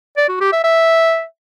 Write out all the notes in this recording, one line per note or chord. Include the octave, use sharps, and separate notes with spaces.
D5
F#4
G4
E5
E5